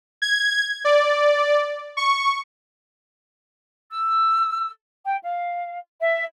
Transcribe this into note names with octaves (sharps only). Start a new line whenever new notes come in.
G#6
D5
C#6
E6
G5
F5
E5